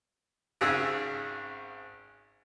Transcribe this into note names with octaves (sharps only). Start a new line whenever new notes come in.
G#1 C#3 G#4 D#6 E6